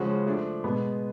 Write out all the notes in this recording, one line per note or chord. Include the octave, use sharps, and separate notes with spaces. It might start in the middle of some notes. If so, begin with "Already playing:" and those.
Already playing: C#3 F3 G#3 C#4 F#4
F3 A3 D4
B2 G#3 B3